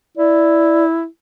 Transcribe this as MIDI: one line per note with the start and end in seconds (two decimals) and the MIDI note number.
0.18 1.06 64
0.18 0.84 74